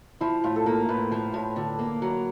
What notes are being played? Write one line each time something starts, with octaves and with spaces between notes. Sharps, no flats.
F3 E4
A2 F4
A4
A#3 A#4
A2 B4
F3
A2
D3
A#3
F#3